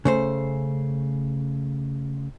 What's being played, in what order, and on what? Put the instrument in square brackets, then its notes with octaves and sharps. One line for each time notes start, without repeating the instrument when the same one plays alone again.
[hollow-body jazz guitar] C#3 A3 C5